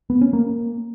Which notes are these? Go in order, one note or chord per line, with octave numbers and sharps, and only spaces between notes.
B3
C#4
A#3